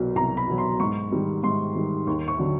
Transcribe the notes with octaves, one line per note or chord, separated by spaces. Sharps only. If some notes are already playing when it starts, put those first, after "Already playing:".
Already playing: C2 B2 F#3
C2 A#5
B5
B2 F#3
C6
G#2 C#6
D#3 G3
G#2 C6
D#3 G3
D#2 C#6
C#6
D3 F#3